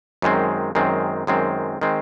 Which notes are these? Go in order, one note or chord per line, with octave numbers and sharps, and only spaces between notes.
F#2 D#3 G#3 C4
F#2 D#3 G#3 C4
F#2 D#3 G#3 C4
D#3 G#3 C4